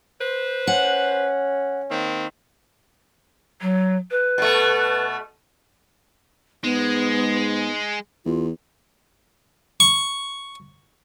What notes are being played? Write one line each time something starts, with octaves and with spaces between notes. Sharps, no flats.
B4 C5
C#4 F#5
D#3 A#3 C4
F#3
B4
B2 A3
G#2 G#3 B3
E2 F4
C#6